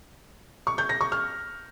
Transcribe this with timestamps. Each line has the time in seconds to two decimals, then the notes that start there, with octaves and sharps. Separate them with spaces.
0.67 C#6
0.78 G6
0.89 A#6
1.01 C#6
1.12 F6